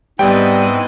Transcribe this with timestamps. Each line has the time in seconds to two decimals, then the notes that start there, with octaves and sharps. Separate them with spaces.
0.19 G#2 G3 B3 C4 E4 D5 D#5 G5